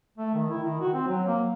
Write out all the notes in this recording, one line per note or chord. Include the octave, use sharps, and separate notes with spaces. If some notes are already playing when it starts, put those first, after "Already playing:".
A3
D#3
E4
D#3
F#4
C4
F#3
A#3